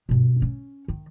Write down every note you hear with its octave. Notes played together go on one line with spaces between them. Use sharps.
G2 B2
C#4
D#3